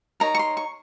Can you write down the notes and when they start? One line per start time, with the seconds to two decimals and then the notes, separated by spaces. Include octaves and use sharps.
0.20 D#4 A#4 C#5 A#5
0.35 C#6
0.39 C6
0.57 C#6